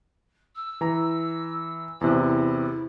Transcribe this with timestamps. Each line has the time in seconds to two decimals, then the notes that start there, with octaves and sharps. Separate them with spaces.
0.56 E6
0.81 E3 A#5
2.01 E2 C3 E4